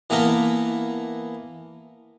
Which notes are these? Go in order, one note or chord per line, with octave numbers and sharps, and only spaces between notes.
E3 A#3 B3 A4 A#4